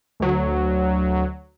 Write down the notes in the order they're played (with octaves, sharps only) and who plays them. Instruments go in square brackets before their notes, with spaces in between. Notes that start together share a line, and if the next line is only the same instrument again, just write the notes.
[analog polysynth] D2 F#3